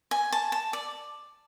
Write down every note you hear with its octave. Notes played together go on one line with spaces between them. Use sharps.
G#5
A5
A5
D5